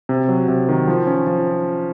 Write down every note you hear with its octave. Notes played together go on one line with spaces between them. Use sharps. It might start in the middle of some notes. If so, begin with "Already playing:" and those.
C3
F#3
C3
D#3
F3
C#4
F3